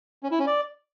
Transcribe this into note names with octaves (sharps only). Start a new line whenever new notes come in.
C#4
E4
C#4
D5